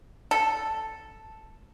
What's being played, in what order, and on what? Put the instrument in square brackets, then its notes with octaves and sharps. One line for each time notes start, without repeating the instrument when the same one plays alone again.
[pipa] A4